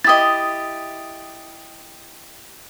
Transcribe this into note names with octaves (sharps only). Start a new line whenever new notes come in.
E4 G4 D#5 D#6 A6